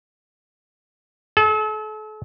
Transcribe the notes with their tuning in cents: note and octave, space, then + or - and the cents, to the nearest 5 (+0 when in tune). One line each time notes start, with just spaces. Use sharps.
A4 -40